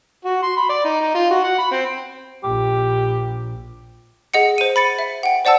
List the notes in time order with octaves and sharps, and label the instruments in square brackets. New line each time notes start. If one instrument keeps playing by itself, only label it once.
[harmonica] F#4
C6
B5
D5
D#4
D#4
F4
F#4
F#5
B5
C4
[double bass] A#1 [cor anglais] G4
[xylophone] G#4 D#5 F#5 C#7
C5 D#7
B5 A6 C#7
E5
F#5 G5
C5 D5 F#5 A5 E6